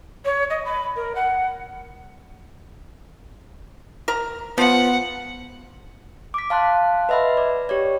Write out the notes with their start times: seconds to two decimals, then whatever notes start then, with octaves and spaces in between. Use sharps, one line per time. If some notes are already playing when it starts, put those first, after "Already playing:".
0.25 C#5
0.50 D#5
0.65 B5
0.96 A#4
1.15 F#5
4.08 A#4 A#5
4.58 F3 B3 F#5
6.34 D6 B6
6.50 F5 A5 C6 F#6
7.09 B4 D#5 E5 F#5 B5
7.37 D5
7.69 G4 C#5 D5